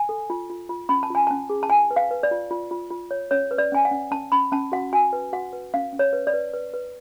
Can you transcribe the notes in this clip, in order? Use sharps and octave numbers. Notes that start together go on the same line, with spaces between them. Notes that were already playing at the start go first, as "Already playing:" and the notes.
Already playing: G#5
A4
F4
F4
F4
C#4 B5
A5
F4 G#5
C#4 A5
G#4
A5
F4 G#5
B4
F5
B4
D5
F4
F4
F4
F4
C#5
C#4 C#5
B4
D5
C#4 G#5
F#5
C#4
C#4 A5
C#4 B5
C#4 A5
F#4 F#5
F#4 G#5
B4
F#4 F#5
B4
C#4 F5
C#4
C#5
B4
D5
B4
B4
B4